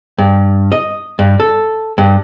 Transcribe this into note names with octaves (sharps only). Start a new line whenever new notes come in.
G2
D#5
G2
A4
G2